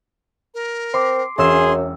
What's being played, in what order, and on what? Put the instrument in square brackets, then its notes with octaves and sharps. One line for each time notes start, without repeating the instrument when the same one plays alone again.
[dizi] A#4
[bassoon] C4 [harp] C6 D6
[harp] E1 C#4 E6 [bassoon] F#2 [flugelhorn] G#4 [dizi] C6